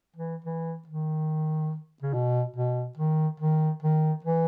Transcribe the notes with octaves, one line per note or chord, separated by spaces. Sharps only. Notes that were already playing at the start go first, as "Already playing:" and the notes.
E3
E3
D#3
C#3
B2
B2
D#3
D#3
D#3
E3